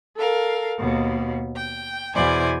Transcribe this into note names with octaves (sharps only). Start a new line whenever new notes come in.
A4 A#4 F5
D#2 B2
G5
E2 B2 E4 C5 D5 G#5